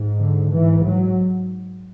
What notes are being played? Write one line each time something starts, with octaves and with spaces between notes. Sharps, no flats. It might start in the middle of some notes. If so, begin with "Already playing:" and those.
Already playing: G#2
D3
G#2 E3
F#3